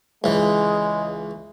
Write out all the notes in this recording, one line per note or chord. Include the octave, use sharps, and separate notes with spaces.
C#2 E3 G#3